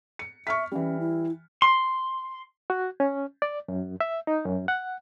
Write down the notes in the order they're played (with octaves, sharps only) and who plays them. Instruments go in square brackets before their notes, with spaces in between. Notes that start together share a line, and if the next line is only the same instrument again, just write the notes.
[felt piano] C#7
[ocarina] E5 [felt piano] C#6 F6 B6
[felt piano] E3 G3 [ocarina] C#4
[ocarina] E4
[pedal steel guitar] C6
[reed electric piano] F#4
C#4
D5
F#2
E5
D#4
F#2
F#5